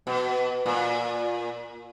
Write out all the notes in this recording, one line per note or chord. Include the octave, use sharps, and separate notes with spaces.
B2
A#2